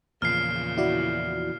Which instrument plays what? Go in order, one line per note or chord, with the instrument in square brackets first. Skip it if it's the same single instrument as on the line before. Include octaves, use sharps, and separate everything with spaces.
[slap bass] E2 F3 [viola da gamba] A#2 C#3 [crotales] F6 C7
[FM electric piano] E4 F#4 D5